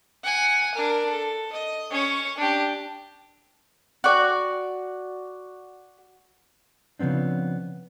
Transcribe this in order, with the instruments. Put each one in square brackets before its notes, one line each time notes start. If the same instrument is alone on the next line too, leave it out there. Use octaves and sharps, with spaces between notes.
[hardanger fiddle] F#5 G#5
D4 A#4
A4
D#5
C#4 C#5
D4 G4
[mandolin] F#4 D5
[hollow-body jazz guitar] C#3 F3 B3 C4 D4